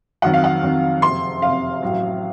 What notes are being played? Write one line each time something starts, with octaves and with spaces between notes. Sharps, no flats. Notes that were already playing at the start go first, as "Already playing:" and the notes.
F2 D#3 F#3 F#5
F5
F#5
F2 D#3 F#3
F#1 F2 C3 C6
F#1 F2 C3 F5
A1 A2 F#3